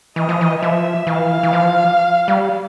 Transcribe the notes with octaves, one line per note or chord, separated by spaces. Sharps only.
E3 D#5
F3
E3
F3 E5
E3 F5
E3
F3
G3